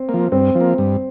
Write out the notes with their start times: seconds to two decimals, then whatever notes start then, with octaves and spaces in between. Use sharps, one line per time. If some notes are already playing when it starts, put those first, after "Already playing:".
Already playing: C4
0.09 F3 A#3
0.32 G2 C4
0.55 F3
0.60 A#3
0.78 G2